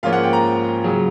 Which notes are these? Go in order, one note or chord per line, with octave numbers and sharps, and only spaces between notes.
G#2 F3 A#3 C#4 F4 F5
F#5
G5
A#5
C#3 F#3